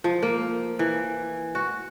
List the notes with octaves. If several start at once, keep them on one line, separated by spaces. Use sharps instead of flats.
F3
A#3
E3
F#4